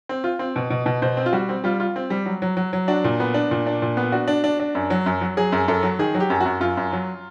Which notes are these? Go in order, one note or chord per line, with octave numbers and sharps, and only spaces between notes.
C4
F4
C4
B2
B2
B2
B2 C5
C4
F4
G3 F#4
C4
G3 F4
F4
C4
G3
F#3
F#3
F#3
F#3
D4 F#4
A#2
B3
D4
A#2
D4
A#2
B3
D4 F#4
D4
D4
D4
F#2
F#3
F#2
F#3
F#3 G#4
F#2
F#2 A4
F#3
D#3 G#4
F#3
G4
F#2
F#4
F#2
F#2 F4
F#2
F#3